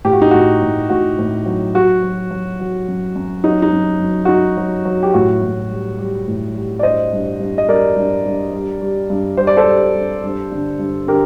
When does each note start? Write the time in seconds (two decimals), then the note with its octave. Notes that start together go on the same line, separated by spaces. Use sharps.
0.05 A2 G4
0.13 F#4
0.22 D#4
0.31 A2 F#4
0.61 A2
0.89 A2 F#4
1.19 A2
1.46 F#3
1.74 F#3 F#4
2.02 F#3
2.31 F#3
2.60 F#3
2.88 F#2
3.15 F#2
3.44 F#3 D#4
3.62 D#4
3.72 F#2
4.00 F#2
4.25 F#4
4.28 F#2 D#4
4.57 F#3
4.85 F#3
5.03 G4
5.14 A2 F#4
5.42 A2
5.70 G3
5.99 G3
6.28 A2
6.55 G3
6.79 D5
6.83 G2 C5 D#5
7.12 G2
7.40 G2
7.58 D#5
7.68 G2 A#4 D5
7.96 G2
8.25 G2
8.53 G3
8.82 G3
9.10 G2
9.37 G3 C5
9.47 D5
9.57 A4 C5
9.66 G3
9.95 G2
10.23 G2
10.52 D3
10.79 G2
11.07 D3 G4 A#4